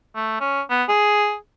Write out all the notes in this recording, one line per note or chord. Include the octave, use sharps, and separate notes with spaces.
A3
C#4
B3
G#4